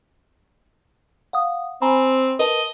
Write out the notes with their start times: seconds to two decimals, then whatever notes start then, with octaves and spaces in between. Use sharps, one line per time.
1.33 F5 F#5 D#6
1.82 C4 G#5 A#5 B5
2.39 A#4 B4 D#5 A5